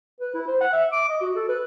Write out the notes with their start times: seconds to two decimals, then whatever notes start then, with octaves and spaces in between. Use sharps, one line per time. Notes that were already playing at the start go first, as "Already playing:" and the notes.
0.20 B4
0.35 E4
0.47 C5
0.61 F#5
0.73 E5
0.92 D6
1.09 D#5
1.21 F#4
1.36 A4
1.49 B4